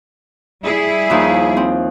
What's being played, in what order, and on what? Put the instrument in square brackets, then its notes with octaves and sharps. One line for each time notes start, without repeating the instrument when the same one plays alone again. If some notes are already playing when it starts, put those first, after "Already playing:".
[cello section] G3 E4 G#4
[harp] D#2 F3 D#4
C4